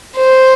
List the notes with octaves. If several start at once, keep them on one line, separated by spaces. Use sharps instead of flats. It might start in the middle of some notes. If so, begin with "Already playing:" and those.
C5